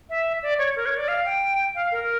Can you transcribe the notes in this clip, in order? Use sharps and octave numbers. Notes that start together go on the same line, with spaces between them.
E5
D5
C#5
A#4
C#5
D5
F5
G5
F5
A#4